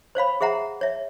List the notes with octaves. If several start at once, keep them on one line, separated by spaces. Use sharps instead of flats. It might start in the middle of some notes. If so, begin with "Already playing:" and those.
C5 C#5 F5 B5
G#4 C5 E5 F#5 A#5
C#5 E5